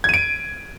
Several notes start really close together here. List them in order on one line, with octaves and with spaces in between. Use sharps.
G#6 D#7 D7